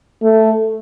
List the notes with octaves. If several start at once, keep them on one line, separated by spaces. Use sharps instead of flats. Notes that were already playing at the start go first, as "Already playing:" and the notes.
A3